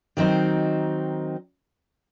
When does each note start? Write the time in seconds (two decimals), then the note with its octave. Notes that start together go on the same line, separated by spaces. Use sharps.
0.17 D#3 F#3 C4 D#4 C5